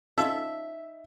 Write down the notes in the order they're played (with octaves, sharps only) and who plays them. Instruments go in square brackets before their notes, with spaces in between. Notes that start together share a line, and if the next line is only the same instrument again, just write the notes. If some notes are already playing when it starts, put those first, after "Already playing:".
[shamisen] C#4 F4 A4 [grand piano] D#4 [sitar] E5